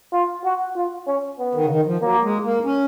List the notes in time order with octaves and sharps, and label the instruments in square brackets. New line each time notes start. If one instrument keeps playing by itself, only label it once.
[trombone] F4
F#4
F4
C#4
B3
[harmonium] D#3
C#3
D#3
F3
[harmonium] F#3 [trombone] A#3
[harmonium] G#3
A#3
C#4